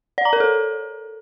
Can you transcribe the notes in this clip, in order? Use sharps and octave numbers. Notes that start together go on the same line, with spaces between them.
D5
A#5
A#4
A4